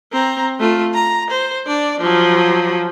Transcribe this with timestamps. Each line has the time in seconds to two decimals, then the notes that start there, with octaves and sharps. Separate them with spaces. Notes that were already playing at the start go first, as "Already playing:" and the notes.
0.12 C4 A#5
0.60 A3 F4
0.94 A#5
1.30 C5
1.67 D4 D5
2.01 F3 F#3